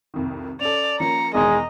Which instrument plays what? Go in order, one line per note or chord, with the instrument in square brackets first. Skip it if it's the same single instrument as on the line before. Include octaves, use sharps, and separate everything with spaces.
[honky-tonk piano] C2 F2 D#3
[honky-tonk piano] C#4 A4 [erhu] D5 [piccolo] F7
[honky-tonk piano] F3 A#3 C#4 [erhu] A#5 [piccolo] C#7
[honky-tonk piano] E2 B2 D#3 [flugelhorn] G#3 [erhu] D#5 [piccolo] A#5